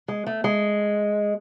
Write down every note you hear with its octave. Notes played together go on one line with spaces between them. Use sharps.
G#3
A3
G#3